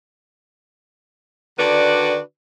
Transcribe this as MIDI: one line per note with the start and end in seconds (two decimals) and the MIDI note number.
1.58 2.19 50
1.58 2.19 51
1.58 2.19 62
1.58 2.19 66
1.58 2.19 71
1.58 2.19 74